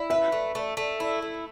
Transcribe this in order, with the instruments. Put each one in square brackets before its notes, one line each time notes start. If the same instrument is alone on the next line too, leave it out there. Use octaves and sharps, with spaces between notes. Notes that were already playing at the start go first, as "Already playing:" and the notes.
Already playing: [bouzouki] E4
[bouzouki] B4 [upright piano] E5
[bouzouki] A3
A3
A3
E4
A3